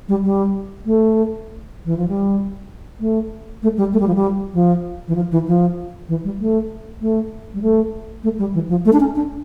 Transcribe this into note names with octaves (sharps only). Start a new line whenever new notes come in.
G3
G3
A3
E3
F3
G3
A3
A3
G3
A3
G3
F3
G3
F3
E3
F3
E3
F3
E3
G3
A3
A3
G3
A3
A3
G3
E3
F3
A3
D4
C#4
D4